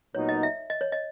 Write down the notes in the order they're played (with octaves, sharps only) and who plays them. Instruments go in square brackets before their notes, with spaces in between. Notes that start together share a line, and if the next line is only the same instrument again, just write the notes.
[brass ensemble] A#2 F#3 B3 D#4 A#4 [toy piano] C#5
[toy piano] D#5
E5
D#5
C#5
D#5